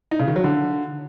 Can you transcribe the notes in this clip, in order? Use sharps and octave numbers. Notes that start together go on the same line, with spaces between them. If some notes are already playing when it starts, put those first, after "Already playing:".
D#4
C#3
D#3
F#3
D3